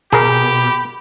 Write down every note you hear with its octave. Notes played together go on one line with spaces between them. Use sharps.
B2 G4 G#4 A#4 B5